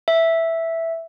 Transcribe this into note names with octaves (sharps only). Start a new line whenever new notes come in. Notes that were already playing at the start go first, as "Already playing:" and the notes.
E5